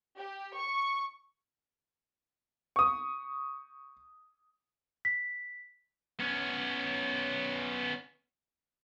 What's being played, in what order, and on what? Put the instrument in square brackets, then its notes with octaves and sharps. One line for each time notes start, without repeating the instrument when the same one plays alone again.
[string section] G4
C#6
[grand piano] C#6 D#6
[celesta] B6
[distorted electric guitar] B3 C#4